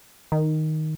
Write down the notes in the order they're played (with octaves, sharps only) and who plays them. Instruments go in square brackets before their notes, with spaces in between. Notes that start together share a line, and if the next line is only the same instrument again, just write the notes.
[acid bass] D#3